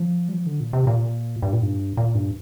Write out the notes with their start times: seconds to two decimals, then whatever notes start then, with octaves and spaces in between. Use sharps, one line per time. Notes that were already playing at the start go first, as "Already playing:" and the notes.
Already playing: F3
0.28 G3
0.33 F3
0.46 D3
0.60 A#2
0.73 C3
0.87 A#2
1.42 G2
1.53 A#2
1.63 G2
1.97 A#2
2.15 G2